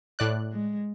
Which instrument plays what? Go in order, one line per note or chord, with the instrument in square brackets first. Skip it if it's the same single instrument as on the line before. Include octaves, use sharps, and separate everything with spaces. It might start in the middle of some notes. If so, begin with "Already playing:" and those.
[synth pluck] A2 D5 F#6
[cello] G#3